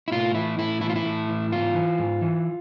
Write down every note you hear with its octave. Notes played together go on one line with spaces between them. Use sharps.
E4
A2 F4
E3 E4
A2 E4
E3 E4
F4
E4
A2
E3
G#2 F4
E3
G#2
E3